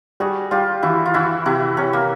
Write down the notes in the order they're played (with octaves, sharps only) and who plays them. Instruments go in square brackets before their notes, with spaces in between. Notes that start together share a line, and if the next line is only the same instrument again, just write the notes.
[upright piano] G3 [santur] F#4 G#4
[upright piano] G3 [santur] F4 G4
[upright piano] E3 [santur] E4 F#4
[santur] F4
[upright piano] E3 [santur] E4 F#4
[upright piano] C3 [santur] E4 F#4
[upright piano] C3 [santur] C#4
[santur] A#3